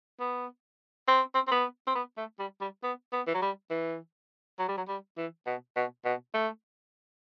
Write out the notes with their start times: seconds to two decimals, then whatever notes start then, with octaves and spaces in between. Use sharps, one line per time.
0.20 B3
1.08 C4
1.34 C4
1.47 C4
1.51 B3
1.87 C4
1.95 B3
2.17 A3
2.39 G3
2.61 G3
2.83 B3
3.12 B3
3.27 E3
3.34 F#3
3.42 G3
3.70 E3
4.59 F#3
4.68 G3
4.77 F#3
4.88 G3
5.17 E3
5.46 B2
5.76 B2
6.05 B2
6.34 A3